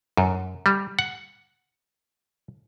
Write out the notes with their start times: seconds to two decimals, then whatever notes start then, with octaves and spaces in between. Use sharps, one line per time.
0.17 F#2
0.66 G3
0.99 F#5